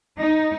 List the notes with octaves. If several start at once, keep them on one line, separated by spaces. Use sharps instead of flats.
D#4